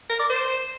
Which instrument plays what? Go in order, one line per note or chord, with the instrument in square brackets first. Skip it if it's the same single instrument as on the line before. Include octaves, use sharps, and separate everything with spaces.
[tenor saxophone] A#4
D5
C5